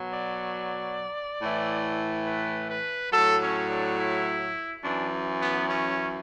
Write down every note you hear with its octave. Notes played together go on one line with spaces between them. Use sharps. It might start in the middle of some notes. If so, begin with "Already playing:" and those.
Already playing: B2 F#3
D5
A2 E3
B4
B4
A2 F#3 A4
C#4
D4
E4
F#2 E3 D4
B3
C#4